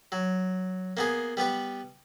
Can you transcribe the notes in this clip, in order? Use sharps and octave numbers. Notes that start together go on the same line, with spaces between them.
F#3
A#3 B3 G#4
G3 B3 G4 B4